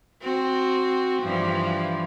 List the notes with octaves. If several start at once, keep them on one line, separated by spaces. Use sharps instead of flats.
C4 F#4
G2 E3 F3